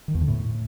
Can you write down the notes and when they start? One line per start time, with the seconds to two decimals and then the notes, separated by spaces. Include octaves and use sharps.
0.08 D#3
0.15 E2
0.21 D3
0.28 A2